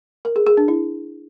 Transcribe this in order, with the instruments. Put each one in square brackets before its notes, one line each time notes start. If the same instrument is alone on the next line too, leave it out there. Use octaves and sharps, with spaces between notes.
[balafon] A#4
G#4
G#4
D4
E4